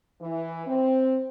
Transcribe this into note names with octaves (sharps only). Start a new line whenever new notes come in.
E3
C4